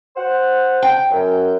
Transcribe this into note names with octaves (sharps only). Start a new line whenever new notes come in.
C5 F#5
G5
F#2